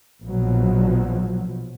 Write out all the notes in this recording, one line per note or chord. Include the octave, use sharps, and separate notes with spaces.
A#1 B2 F3 F#3